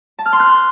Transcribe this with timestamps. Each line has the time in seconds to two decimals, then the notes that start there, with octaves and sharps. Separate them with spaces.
0.19 A5
0.26 F6
0.33 C6
0.40 F#6